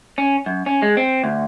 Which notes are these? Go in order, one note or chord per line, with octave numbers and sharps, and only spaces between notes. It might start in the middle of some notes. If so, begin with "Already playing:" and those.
C#4
F#2
C#4
G#3
C4
D2